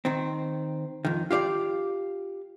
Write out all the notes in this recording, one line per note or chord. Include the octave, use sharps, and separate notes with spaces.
D#3 C4
F2 D#3
F4 G4 D5 F5